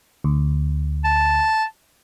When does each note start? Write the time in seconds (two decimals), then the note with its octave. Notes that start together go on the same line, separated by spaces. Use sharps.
0.24 D2
1.05 A5